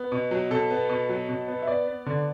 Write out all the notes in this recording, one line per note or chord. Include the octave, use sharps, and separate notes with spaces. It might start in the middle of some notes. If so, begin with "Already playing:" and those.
Already playing: B3
B2
F#3
B2 A4
B3
B2
F#3
B2
B3
E5
B3 D5
B3
D3